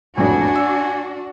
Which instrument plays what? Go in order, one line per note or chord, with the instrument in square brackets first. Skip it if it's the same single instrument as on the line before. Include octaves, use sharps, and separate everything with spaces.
[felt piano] E1 A1 F2 [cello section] D4 F#4 [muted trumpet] G#5
[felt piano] E6